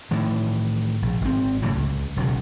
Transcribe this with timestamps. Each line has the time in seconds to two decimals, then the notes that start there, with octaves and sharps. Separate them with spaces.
0.11 A2 D#3 E3
1.02 A#1
1.22 G#1 C4
1.62 A2 C#3 E3 F#3
1.75 C#2
2.17 E1 C#3 F#3